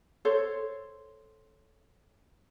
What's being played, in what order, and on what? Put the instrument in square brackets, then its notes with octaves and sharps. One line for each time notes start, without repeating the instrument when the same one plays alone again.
[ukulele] A4 C5 C#5